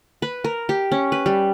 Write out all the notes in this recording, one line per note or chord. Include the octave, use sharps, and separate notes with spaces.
B4
A#4
G4
C#4
B4
G3